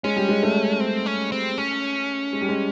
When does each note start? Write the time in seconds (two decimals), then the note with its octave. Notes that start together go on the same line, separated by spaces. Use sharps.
0.04 G#3 C#4
0.17 G3
0.29 G#3
0.43 A3
0.80 C4
1.06 C#4
1.32 C4
1.58 C#4
2.33 G#3
2.41 G3
2.49 G#3